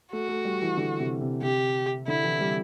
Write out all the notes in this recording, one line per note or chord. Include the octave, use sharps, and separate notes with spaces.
A3 F#4
A3
G3
E3
D3
C3
C3
C3 G4
D3 E4
E3
G3